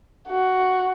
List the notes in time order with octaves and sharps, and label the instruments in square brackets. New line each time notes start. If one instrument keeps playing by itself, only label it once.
[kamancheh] F#4